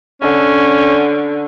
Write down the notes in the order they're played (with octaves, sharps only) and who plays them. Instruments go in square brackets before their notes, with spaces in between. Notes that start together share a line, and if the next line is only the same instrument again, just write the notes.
[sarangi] D3 [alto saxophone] C#4